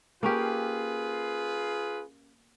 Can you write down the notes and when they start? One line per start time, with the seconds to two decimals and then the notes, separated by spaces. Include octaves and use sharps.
0.23 A#3 C#4 F4 G4 G#4 B4